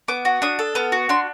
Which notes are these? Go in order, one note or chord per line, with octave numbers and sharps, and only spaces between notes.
B3 D6
F#4
D4 D#6
A4
B3 F6
F#4
D4 C6